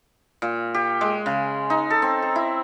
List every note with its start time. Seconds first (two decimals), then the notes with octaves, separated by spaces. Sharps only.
0.42 A#2
0.74 G4
1.01 G#3
1.26 C#3
1.70 D#4
1.90 A4
2.02 C4
2.22 A#5
2.36 E4